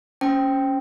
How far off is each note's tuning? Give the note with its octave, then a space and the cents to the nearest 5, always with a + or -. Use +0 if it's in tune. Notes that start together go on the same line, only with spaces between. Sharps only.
C#4 +0 C5 +0 G5 +0